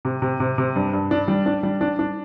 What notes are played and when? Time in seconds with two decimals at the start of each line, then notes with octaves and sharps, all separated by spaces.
0.05 C3
0.22 C3
0.40 C3
0.58 C3
0.76 G2
0.93 G2
1.11 D4
1.28 G3
1.46 D4
1.63 G3
1.81 D4
1.99 D4